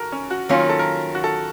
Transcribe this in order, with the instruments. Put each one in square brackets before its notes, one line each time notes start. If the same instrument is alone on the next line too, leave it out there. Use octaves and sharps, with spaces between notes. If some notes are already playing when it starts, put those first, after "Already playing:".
Already playing: [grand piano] F#4 A4 A#4
C#4
F#4
[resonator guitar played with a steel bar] D#3 F#3 A#3 C#4 F4
[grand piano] A#4
A4
A#4
F#4
A4